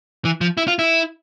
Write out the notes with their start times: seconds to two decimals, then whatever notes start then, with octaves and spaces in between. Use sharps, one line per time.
0.25 E3
0.41 F3
0.57 E4
0.68 F4
0.79 E4